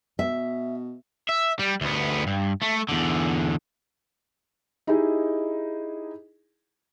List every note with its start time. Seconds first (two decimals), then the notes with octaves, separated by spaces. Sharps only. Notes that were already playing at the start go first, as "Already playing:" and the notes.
0.19 B2 E5
1.29 E5
1.59 G3
1.81 D2 B3
2.27 G2
2.62 A3
2.89 E2 D3
4.87 D#4 E4 G4 G#4 D#5